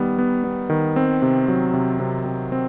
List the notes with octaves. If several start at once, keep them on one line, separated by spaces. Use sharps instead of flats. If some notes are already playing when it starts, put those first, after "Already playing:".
Already playing: D#3 G3 B3
B3
B3
D#3
C4
C3
F#3
C3
C3
C3
C4